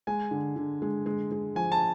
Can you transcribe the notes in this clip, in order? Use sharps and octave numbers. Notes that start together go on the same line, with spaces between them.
G#3 G#5
D3
D3
G#3
G#3
G#3
F3 G#5
A5